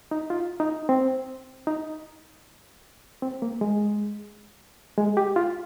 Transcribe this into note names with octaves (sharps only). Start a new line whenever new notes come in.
D#4
F4
D#4
C4
D#4
C4
A#3
G#3
G#3
G4
F4